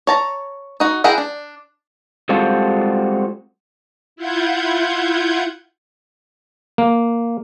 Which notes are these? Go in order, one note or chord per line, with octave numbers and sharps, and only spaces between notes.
C#5 A5 A#5
D#4 F#4
E4 G#4 A#4 F#5 G5
D4
G3 G#3 C4 F4 F#4 A4
E4 F4 F#5 G6 G#6
A#3